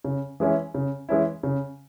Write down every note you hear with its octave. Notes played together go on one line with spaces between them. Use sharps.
C#3
E3 G#3 C#4 E4
C#3
E3 G#3 C#4 E4
C#3